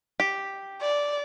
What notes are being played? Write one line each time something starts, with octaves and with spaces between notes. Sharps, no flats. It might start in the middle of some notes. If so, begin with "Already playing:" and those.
G4
D5